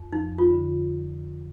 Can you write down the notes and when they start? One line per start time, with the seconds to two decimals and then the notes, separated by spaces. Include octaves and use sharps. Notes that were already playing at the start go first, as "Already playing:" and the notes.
Already playing: F2
0.12 F3 D#4
0.32 F2
0.38 F4
0.51 D3